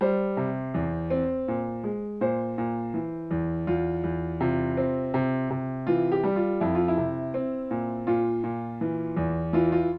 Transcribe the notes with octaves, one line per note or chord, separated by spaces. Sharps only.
G3 C5
C3
E2
C4
A#2
G#3
A#2 C5
A#2
E3
E2
E2 F4
E2
C3 F4
C4
C3
C3
E3 F4
G4
G3
F4
F2 E4
F4
E4
C3
C4
A#2
A#2 F4
A#2
E3
E2
E3 F4
F4